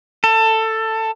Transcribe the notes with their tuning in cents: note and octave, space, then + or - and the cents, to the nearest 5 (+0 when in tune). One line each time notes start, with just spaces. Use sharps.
A4 +15